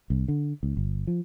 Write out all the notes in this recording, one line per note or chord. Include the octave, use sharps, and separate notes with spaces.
C2
D3
C#2
G1
F3